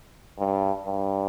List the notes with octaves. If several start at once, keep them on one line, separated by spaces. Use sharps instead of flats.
G2
G2